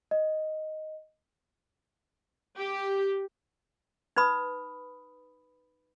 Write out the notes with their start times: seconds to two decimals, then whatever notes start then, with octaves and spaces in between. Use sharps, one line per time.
0.11 D#5
2.57 G4
4.16 D#4 B4 B5 D#6